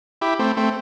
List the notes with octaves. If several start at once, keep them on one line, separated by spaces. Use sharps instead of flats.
E4 G4
A3 C4
A3 C4